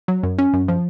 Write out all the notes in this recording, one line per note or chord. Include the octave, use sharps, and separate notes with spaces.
F#3
F#2
C#4
F#2
F3